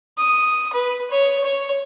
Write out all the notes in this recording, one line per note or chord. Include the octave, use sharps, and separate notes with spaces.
D#6
B4
C#5
C#5